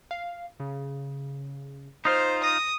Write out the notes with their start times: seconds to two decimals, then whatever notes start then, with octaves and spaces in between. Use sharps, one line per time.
0.11 F5
0.60 C#3
2.05 D#4 F4 C5
2.44 D#6 A#6